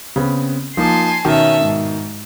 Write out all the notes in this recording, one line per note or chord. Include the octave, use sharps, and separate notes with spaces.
C#3 B3 C4
F3 A#3 D#4 G#5 A5 C6
B2 D#3 C#4 E5 A5
G#2